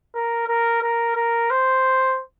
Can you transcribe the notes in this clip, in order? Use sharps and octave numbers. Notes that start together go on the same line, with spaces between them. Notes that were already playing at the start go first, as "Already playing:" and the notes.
A#4
A#4
A#4
A#4
C5